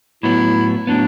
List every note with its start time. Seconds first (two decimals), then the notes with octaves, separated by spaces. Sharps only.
0.23 A2 F#3 B3 E4
0.87 A2 F#3 B3 D4